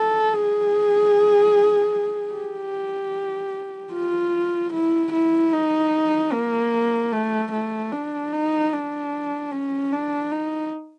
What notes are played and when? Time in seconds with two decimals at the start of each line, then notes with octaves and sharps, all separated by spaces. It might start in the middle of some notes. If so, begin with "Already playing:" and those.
Already playing: A4
0.33 G#4
2.33 G4
3.93 F4
4.73 E4
5.13 E4
5.53 D#4
6.32 A#3
7.12 A3
7.52 A3
7.92 D4
8.33 D#4
8.72 D4
9.51 C#4
9.92 D4
10.32 D#4